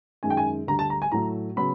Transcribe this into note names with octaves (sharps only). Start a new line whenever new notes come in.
F#2 D#3 G#3 G#5
G5
G#5
D2 D3 G3 A#5
A5
A#5
G#5
A2 F#3 A3 A#5
C#3 F#3 B3 B5